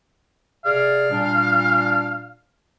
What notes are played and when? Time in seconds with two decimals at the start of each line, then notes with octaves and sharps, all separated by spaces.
0.65 C3 G#4 D5 F5
1.10 A#2 G3 D4